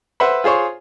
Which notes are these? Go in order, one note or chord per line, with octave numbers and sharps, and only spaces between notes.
B4 C5 E5 F#5 B5
F4 G#4 C5 C#5